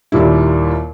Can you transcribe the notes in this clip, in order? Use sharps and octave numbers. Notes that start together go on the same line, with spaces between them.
D#2 A#2 G3 E4